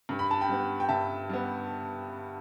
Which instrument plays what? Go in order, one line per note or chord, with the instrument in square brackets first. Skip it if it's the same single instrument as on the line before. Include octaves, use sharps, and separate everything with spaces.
[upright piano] G2
B5
A5
G5 B5
G3 B3
G5
G2 E5 A5
G3 B3